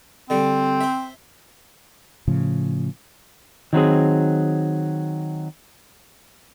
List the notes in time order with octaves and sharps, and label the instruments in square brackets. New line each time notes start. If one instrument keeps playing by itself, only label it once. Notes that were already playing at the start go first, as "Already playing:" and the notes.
[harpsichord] D3 G3 [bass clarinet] C4
[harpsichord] C5 E5
[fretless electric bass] A2 C#3 F3
[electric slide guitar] D#3 F#3 C4 G#4